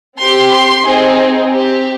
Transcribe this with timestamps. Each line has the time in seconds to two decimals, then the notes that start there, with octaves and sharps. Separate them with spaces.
0.18 C4 G4 C6
0.51 C6
0.85 C4 D#4 G#4
1.50 C4 G4